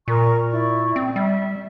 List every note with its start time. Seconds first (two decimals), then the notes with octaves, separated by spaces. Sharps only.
0.08 A#2 A#4 A#5 C#6
0.51 E4 D5 C#6
0.96 C4
1.16 G3 E5